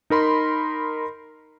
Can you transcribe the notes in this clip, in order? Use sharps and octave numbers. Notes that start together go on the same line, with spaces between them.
D#4 A#4 B5 C6